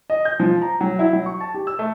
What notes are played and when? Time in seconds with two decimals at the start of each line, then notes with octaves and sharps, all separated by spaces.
0.10 D#5
0.25 G6
0.40 F3
0.62 A#5
0.81 F#3
0.99 E4
1.13 F#3
1.26 C#6
1.41 A5
1.54 G4
1.67 E6
1.79 A3